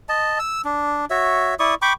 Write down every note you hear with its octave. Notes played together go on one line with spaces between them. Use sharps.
D#5 A5
E6
D4
F#4 C#5 E5
E4 D5 C#6 D#6
G5 B5 C#6 D6